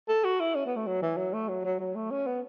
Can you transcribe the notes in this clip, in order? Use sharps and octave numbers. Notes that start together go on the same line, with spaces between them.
A4
F#4
E4
C#4
B3
A3
F#3
E3
F#3
A3
F#3
F#3
F#3
A3
C#4
B3